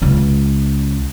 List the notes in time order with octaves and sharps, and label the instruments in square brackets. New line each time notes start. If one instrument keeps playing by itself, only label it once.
[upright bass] C#2 C#3